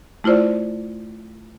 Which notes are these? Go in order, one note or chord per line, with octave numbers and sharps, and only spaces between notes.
A3 E4 F4 C5 D5